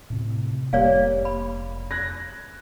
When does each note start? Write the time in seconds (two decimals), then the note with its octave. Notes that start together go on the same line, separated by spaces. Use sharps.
0.10 A2 C3
0.73 F1 G3 A#3 C#5 D5 F5
1.25 B5
1.91 F#6 G#6 A#6